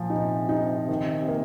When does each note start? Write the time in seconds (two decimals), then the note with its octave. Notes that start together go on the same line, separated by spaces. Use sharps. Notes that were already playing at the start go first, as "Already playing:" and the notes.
Already playing: A#2 F3
0.09 C3 D#4
0.49 D#4
0.89 D#3
1.28 A#3